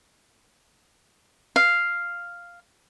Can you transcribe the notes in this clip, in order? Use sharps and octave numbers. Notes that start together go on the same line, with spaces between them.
F5